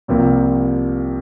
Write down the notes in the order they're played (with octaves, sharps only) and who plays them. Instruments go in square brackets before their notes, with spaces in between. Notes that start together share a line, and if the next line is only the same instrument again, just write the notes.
[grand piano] C2 C3 F3 A#3